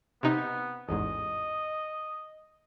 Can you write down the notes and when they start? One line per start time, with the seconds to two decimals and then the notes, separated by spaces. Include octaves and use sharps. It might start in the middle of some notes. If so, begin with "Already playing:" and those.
0.23 C3 B3 D#4
0.89 A1 E2 G#2 D#5